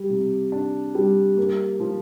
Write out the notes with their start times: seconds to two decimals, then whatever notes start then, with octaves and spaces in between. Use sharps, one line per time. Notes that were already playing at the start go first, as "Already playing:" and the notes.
Already playing: G3
0.10 C3
0.52 D4
0.95 G3
1.37 A#3
1.80 F3